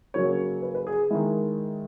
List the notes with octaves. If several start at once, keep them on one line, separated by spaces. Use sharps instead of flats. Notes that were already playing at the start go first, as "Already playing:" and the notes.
C#3 F#3 A#3 C#5
B4
B4
G#4
D#3 G#3 E4